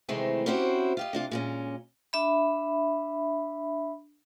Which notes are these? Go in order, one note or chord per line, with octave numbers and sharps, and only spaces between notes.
C3 D#3 E3 G#3 A3 C4
C4 C#4 E4 F#4 G4 C5
F4 G4 D#5
C3 D4 F4
A#2 G#3 C#4
D4 E5 B5